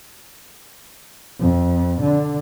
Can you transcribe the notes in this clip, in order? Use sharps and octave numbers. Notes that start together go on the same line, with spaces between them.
F2
D3